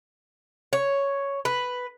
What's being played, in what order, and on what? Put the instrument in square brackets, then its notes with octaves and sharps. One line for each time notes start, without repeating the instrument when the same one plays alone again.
[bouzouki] C#5
B4